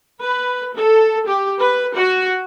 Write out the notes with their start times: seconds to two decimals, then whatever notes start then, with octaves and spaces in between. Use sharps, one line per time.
0.22 B4
0.75 A4
1.27 G4
1.60 B4
1.97 F#4